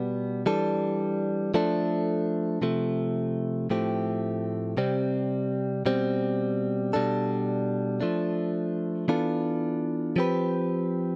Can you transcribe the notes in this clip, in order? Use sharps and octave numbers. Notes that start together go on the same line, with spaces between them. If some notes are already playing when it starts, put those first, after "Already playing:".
Already playing: B2 G3 B3
E3 G3 D4 A4
F3 A3 D4 A4
C3 F3 A3
A2 F3 A3 C4 G4
C3 G3 C4
B2 G3 C4
B2 G3 D4 A4
F3 A3 D4
E3 B3 D4 F4 A4
F3 C4 G4 B4